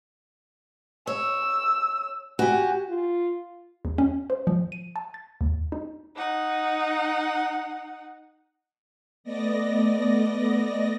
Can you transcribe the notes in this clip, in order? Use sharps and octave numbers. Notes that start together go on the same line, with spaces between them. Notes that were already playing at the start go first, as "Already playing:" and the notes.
C#5 E6
F#4 G4 G#5
F4
E2
C#4
C5
F3
D#7
A5
A6
D#2
D#4
D#4 F#5
A3 B3 D5 D#5 A#6